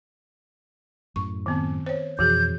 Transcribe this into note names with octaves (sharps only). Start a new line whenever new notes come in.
F#2 A2 C#6
D#3 B3 C4
C5 C#5
F2 B2 E3 F#4 G#4 G6